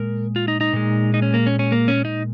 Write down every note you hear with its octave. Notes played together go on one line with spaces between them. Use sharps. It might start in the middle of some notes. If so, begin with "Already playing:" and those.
Already playing: A#2 G#3 A#4
F4
D#4
D#4
A#2 G#3
D#4
C#4
A#3
C#4
C#4
A#3
C#4
D#4